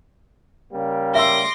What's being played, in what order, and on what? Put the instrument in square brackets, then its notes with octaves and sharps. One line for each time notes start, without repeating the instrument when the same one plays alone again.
[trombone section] C#3 G3 A#3
[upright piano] E5 E6 [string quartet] C6 D6 A#6